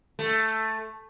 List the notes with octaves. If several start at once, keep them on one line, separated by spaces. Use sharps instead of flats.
A3